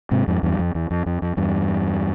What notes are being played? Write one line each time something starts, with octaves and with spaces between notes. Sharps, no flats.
G#2 C3
F2 G#2
E2 G2
F2
E2
F2
F2
F2
E2 G2